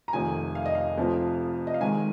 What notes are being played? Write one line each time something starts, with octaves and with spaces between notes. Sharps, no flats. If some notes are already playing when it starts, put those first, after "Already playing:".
A#5
F1 F2 D#3 G#5
F5
D#5
F5
F1 F2 F3
D#5
F5
G#1 G#2 D#3 G#5